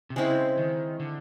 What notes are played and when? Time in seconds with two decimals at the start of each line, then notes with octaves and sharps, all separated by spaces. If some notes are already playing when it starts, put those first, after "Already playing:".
0.10 C3
0.16 C#3 G#3 C4 E4
0.58 D#3
1.00 D3